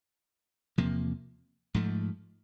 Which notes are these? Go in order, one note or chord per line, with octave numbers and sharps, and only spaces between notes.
E2 C3 F3 A#3
G#2 F3 A3